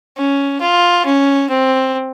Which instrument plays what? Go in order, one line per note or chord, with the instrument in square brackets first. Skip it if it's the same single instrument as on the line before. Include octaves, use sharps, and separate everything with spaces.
[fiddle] C#4
F4
C#4
C4